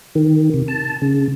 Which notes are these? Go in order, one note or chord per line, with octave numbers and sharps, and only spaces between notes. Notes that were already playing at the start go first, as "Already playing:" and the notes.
D#3
C3
A5
C#3